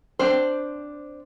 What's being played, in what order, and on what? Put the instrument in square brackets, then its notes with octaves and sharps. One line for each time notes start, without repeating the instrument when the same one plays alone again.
[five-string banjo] C4 D4 C5